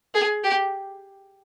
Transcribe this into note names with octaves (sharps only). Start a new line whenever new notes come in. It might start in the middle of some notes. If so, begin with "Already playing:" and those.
G#4
G4